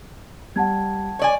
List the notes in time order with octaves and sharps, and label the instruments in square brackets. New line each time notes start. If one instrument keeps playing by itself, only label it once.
[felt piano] G3 [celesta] F#5 A5 G#6
[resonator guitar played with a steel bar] C#5 D5 G#5